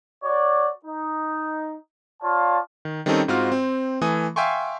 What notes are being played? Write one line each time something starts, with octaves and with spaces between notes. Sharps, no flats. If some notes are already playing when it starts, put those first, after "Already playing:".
F#4 C#5 D5
D#4
F4 C#5 D5 F5 A5
D#3
D#3 G3 C4 C#4 D#4 A4
G#2 C4 F4 F#4 F6
C4
E3 A3 G#5 D#6
E5 F5 G5 G#5 C6 C#6